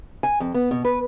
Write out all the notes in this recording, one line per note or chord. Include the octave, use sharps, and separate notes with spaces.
G#5
F2
B3
B2
B4